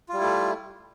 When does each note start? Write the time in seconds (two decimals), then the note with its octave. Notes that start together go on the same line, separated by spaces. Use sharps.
0.09 F4
0.13 G3
0.18 E4
0.22 A3